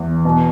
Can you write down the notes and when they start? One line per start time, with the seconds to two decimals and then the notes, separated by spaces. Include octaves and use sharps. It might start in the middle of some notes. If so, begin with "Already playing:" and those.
Already playing: E2 E3
0.25 B2